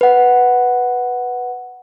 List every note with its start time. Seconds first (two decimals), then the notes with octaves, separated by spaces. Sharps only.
0.01 B4 F#5